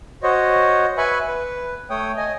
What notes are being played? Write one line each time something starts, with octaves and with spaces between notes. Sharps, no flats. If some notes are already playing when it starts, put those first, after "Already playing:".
F#4 C5 C#5 D#5
B4 E5 G#5 B5 C#6
B4
A3 C#5 G5 D#6
D#5 G#5